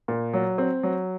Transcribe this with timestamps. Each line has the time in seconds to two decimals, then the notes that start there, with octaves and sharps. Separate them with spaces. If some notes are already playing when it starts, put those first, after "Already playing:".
0.08 A#2
0.33 F#3
0.58 C4
0.83 F#3